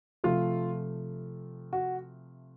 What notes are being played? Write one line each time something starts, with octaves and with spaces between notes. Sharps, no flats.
C3 F3 A3 F4
F#4